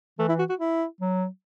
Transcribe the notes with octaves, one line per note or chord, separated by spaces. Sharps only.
E3 A3
E4
F#4
F#4
E4
F#3